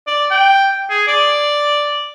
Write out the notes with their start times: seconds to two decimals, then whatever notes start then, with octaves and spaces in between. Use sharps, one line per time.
0.07 D5
0.31 G5
0.90 G#4
1.08 D5